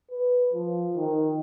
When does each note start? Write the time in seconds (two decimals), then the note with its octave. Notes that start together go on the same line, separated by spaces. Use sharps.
0.11 B4
0.53 F3
0.96 D#3